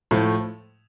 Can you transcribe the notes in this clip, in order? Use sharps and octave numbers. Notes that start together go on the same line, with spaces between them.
A2 F3 A3